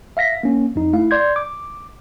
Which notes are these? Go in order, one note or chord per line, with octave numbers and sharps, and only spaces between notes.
E5 F5 A#6 B6
A#3 C#4
F2 D#4
A3 E4 F5
D5 C6 G6 G#6
D6